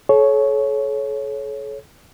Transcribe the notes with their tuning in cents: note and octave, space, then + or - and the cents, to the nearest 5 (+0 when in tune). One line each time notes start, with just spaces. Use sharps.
A4 -40 C#5 +0